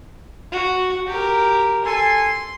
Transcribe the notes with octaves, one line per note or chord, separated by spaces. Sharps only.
F#4
G4 A#4
A4 G#5 C6